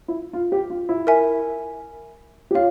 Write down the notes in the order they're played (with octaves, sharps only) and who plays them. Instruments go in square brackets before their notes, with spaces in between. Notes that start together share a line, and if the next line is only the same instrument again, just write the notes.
[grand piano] E4
F4
G4
F4
E4
[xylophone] A#4 E5 G#5
[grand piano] G4
[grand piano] F4 [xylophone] C#5 F5